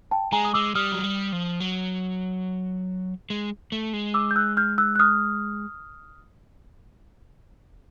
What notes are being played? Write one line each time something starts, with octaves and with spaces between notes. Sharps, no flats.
G5 A5
G#3 G#5 A#5
D#6
G#3 D6 E6
G3 D#6 F6
F#3
G3
F3
F#3
G#3
A3
G#3
D6 E6
G6
E6 F#6
F6 G6
E6 F#6
F#6
D#6 F6